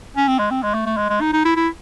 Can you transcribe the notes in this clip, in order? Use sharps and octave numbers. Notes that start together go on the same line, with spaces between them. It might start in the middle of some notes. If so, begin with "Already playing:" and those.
C#4
C4
G#3
C4
G#3
A3
A3
G#3
G#3
D#4
D#4
E4
E4